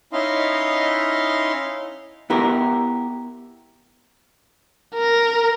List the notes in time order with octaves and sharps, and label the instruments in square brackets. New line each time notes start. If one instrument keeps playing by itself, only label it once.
[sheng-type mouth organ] C#4 D#4 E4 D#5 F5 C6
[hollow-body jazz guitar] B3 E4 G4 A#4
[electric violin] A#4